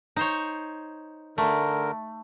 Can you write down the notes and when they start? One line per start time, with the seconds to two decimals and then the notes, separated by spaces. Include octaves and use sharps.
0.16 D#4 C5 C#5
1.38 D3 A3 A#4